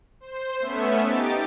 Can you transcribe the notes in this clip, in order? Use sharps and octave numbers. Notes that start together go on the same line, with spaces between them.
C5
A3 B3 C#4 E5
D#4 G4 A6 D7